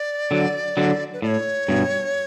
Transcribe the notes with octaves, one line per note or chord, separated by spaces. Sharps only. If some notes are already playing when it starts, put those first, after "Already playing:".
Already playing: D5
D3 F#3
D3 F#3
B4
A2 C#5 D5
G2 B2